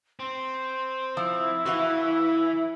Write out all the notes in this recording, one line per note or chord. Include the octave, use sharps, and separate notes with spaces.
C4 C6
F3 E4 E6
E3 F#4 B4 F5